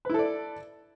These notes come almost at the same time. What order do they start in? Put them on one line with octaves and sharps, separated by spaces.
B4 E4 A4 D5